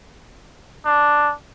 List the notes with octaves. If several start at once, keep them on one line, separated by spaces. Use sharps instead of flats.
D4